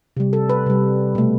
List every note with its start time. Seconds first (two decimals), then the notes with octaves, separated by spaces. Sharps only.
0.17 C3 G3
0.33 A4
0.49 B4
0.66 C3 G3
1.15 B2 A3